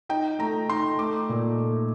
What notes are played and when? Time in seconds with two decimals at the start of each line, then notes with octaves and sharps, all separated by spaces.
0.09 D#4 G5
0.39 A3 A#5
0.70 D#4 C6
0.99 A3 D6
1.29 A#2
1.58 A3